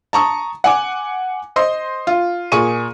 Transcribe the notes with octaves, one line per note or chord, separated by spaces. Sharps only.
A5 A#5 C#6 D#6
F#5 G#5 D6
C5 D#5 C6
F4
A#2 G#4 C#6 D#7